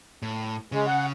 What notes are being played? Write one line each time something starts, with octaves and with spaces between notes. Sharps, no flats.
A2
C#3 G#3
F#5